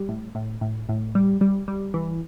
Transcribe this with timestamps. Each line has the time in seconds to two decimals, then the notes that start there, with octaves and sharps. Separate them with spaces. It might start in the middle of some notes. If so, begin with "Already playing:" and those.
Already playing: G3
0.09 A2
0.35 A2
0.61 A2
0.89 A2
1.15 G3
1.41 G3
1.68 G3
1.94 E3